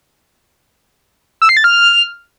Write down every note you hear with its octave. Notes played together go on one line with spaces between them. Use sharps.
E6
C7
A6
F6